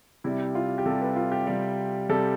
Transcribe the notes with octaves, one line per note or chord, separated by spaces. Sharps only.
C3 G3 E4
F4
G4
C3 G3 A4
B4
F4
G4
C3 G3
C3 G3 A4